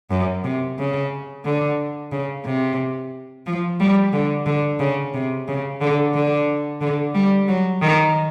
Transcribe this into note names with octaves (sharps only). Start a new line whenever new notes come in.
F#2
C3
C#3
D3
C#3
C3
F3
G3
D3
D3
C#3
C3
C#3
D3
D3
D3
G3
F#3
D#3